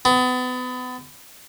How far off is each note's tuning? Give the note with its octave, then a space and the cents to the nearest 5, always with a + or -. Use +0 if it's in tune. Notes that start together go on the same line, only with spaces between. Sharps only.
B3 +30